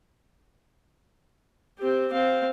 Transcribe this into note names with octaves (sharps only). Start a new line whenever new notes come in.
C4 G4
C4 F5